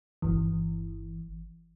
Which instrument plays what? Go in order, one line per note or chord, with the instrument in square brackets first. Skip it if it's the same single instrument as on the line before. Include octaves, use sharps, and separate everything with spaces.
[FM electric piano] G1 E3